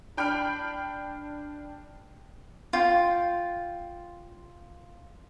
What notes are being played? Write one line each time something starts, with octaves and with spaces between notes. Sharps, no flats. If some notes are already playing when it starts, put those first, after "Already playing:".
D4 G5 B5 F6 D7
F4 G5